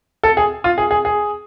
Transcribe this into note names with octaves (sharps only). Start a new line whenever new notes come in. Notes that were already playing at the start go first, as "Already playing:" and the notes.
A4
G#4
F4
G#4
G#4
G#4